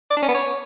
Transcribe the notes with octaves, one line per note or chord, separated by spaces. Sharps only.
D5
D4
C#4
B3
C#5